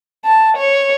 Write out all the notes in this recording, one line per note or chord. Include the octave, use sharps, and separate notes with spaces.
A5
C#5